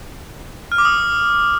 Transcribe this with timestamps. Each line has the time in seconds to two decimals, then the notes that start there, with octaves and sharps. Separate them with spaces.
0.72 F6
0.78 D6
0.85 D#6